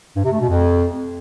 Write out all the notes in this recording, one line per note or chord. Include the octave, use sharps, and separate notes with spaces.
G2
C3
A3
B2
F2